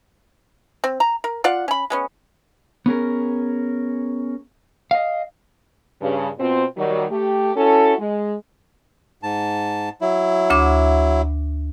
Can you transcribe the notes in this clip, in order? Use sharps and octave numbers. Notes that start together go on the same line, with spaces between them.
C4
A#5
A#4
F4 D5 F5 F#5
C#4 B5
G#3 B3 C#4
B3 C#4 G#4 A#4
D#5 F5
G2 C#3
B2 C4 F4 C5
D#3 F#3 G3
A3 G4
C#4 E4 F#4 A4
G#3
G#2 A5
F#3 E4
D2 E5 D6